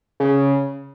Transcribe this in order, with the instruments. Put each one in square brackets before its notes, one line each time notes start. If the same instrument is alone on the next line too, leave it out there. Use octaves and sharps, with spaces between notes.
[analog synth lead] C#3